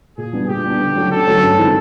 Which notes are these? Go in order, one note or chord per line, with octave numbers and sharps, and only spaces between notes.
A#2 G#4
G3 B3 D4
A#2 G4
G3 B3 D4
D3
F#3 A3 C#4
D3 A4
F#3 A3 C#4
G2
D#3 G#3 C4 D#4